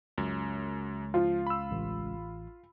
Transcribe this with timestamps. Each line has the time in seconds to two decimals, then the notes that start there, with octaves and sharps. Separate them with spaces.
0.18 C#2 F#2
1.14 F3 F4
1.47 B5 E6
1.71 A1